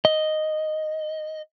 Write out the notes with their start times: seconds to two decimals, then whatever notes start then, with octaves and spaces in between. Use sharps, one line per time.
0.05 D#5